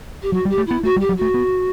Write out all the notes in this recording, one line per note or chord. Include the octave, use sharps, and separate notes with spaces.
G4
F#3 F#4
G3
G4
A3
B3 E4
A3 F#4
G3
G4
F#3
A3 F#4
B3